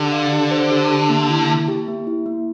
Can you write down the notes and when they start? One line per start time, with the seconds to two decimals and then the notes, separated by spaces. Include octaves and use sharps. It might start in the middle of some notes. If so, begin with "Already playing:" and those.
Already playing: D3 G4
0.12 F5
0.32 G4
0.51 C5
0.71 G4
0.91 G4
1.10 A#3
1.30 E4
1.48 A#3
1.68 G4
1.88 A#3
2.07 E4
2.26 A#3